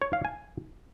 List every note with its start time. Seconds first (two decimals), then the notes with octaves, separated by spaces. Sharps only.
0.02 C#5
0.13 F5
0.25 G#5